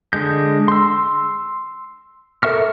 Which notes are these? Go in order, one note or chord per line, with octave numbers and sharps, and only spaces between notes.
D3 G#3 G6
C6 E6
A4 A#4 E5 C#6 F6